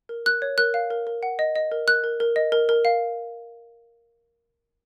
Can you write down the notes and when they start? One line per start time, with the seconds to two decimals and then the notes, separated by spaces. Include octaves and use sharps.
0.09 A#4
0.26 A#4 F#6
0.42 C#5
0.58 A#4 F#6
0.74 F5
0.91 A#4
1.07 A#4
1.23 F#5
1.39 D#5
1.56 D#5
1.72 A#4
1.87 A#4 F#6
2.04 A#4
2.20 A#4
2.36 D#5
2.52 A#4
2.69 A#4
2.85 F5